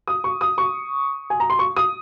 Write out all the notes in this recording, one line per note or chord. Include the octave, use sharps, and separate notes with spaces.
D#6
C#6
D#6
C#6
G#5
A#5
C6
C#6
D#6